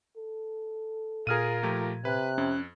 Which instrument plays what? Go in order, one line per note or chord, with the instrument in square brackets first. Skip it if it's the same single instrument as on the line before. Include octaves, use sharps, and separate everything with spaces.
[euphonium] A4
[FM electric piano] A#2 G#6 [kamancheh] F4 A#4 [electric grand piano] G#4 F6 D#7
[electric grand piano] F3 A3 G4
[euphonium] C3 [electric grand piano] B4 [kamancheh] F#6
[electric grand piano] F2 [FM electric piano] C#4